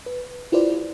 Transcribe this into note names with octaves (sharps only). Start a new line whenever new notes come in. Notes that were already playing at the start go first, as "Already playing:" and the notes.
B4
E4 F4 G4 B4 C5 D5